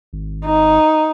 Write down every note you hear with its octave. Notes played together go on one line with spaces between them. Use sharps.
G#1
D#4